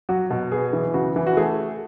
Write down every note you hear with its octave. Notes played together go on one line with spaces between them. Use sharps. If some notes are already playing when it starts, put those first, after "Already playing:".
F#3 F#4
B2
B3 G#4
E3
C#3 F#4
E3
F#4
A3 G#4